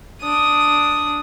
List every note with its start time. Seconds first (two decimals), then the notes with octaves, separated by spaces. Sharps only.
0.22 D4 D#6